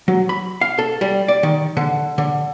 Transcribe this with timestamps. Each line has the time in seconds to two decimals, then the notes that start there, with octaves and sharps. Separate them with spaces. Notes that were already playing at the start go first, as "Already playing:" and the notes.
0.08 F#3
0.29 B5
0.61 F5
0.79 A4
1.01 G3
1.28 D5
1.43 D#3
1.77 D3
2.18 D3